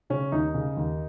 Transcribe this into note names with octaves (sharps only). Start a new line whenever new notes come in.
C#3 C#4
D#2 D#4
C#3
D#2